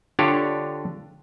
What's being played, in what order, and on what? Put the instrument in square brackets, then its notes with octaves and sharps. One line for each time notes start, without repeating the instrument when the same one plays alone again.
[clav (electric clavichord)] D3 D4 F4 G4 C#5